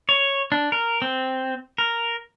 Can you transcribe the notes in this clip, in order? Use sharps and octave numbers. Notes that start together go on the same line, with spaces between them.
C#5
D4
A#4
C4
A#4